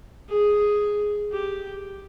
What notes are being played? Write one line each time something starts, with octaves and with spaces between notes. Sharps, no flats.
G#4
G4